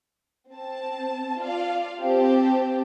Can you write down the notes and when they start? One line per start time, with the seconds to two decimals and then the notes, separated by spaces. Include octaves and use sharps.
0.51 C4 A5
1.39 F4 D5 F5
2.00 C4 G4 C5 A5